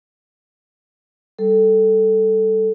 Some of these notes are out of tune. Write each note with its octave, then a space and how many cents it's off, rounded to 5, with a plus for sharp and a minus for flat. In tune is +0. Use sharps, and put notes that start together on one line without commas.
G3 +0 A4 +0